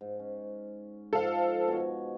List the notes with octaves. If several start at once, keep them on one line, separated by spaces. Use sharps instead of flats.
G#2
C#4
G#2 F3 A4 F5
B2 C#5